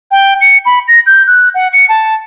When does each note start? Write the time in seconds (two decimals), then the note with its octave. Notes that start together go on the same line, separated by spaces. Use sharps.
0.11 G5
0.41 C#7
0.65 B5
0.88 A#6
1.06 G6
1.27 F#6
1.54 F#5
1.73 C#7
1.89 A5